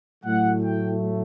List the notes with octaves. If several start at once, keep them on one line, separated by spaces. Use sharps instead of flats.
A2 F#3 A3 F#5
G5